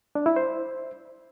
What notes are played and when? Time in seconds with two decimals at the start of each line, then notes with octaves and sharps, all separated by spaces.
0.15 D4
0.26 E4
0.36 C5